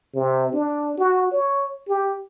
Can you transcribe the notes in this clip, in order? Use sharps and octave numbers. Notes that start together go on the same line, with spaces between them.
C3
D4
F#4
C#5
G4